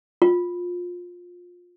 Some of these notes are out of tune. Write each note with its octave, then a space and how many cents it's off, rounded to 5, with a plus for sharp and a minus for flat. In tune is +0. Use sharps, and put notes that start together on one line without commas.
F4 +20